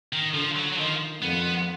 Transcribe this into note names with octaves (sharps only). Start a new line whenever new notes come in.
D#3
D3 F3
F#3
F#3
D#3 F3
F2 F3 B3